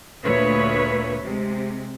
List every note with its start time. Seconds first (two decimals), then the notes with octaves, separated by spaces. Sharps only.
0.24 D2 A#2 B4 C#5 E5
1.23 C3 G#3